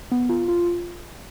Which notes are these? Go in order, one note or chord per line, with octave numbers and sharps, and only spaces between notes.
B3
F4
F4